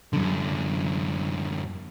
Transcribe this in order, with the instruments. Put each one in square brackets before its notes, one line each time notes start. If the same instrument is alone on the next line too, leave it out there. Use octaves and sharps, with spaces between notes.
[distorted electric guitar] F#2 D3